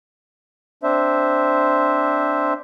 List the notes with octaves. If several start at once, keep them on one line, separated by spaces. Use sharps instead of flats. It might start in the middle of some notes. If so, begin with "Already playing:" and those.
C4 D4 C5 E5